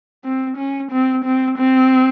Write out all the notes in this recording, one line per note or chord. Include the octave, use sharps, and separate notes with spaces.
C4
C#4
C4
C4
C4